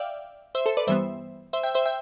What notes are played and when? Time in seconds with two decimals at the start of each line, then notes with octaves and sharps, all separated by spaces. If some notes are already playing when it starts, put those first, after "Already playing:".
Already playing: D5 E5 F5 G5
0.55 C5 E5
0.66 A4 C5
0.77 B4 D5
0.87 G2 E3 G3 B3 C5 E5
1.53 C5 E5
1.63 E5 G5
1.75 C5 E5
1.86 E5 G5